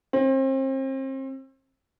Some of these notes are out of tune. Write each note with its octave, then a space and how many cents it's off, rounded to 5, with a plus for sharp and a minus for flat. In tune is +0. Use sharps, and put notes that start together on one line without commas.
C4 +35